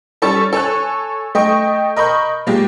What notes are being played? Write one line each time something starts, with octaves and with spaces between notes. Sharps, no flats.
G3 C#4 A4 C#6 A6
A4 C#5 G#5 F#6
A3 D#5 G5 C#6
A#4 D#5 B5 C#6 G6
A#2 G#3 A#3 G4